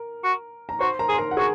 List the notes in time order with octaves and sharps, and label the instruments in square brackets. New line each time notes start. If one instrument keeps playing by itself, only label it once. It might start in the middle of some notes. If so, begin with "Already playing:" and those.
Already playing: [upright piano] A#4
[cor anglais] F#4
[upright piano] A#5
[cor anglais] F#4 [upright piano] C5 C6
[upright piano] A#4 A#5
[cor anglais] G#4
[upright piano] C6
A#4 A#5
F#5
[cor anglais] F#4 [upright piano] G#4 G#5